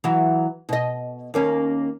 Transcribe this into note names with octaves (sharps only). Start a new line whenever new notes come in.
E3 F#3 F#4
B2 D#5
D#2 A#3 C#4